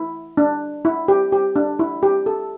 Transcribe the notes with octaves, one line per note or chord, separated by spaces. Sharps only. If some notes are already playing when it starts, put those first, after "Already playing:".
Already playing: E4
D4
E4
G4
G4
D4
E4
G4
A4